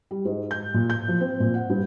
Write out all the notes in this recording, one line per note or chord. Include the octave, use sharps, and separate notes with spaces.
G3
G#2
G6
A#2
G6
F3
C4
A#2
F#5
G2